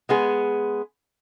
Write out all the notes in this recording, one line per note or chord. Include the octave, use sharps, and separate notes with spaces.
G#3 B3 G#4